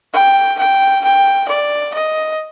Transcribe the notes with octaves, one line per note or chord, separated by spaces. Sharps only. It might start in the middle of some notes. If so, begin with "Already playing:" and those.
G5
G5
G5
D5
D#5